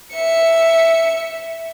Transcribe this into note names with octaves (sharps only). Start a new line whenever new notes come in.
E5 C#7